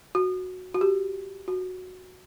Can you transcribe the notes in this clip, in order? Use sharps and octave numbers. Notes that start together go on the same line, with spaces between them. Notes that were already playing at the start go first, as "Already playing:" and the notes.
F#4
F#4
G4
F#4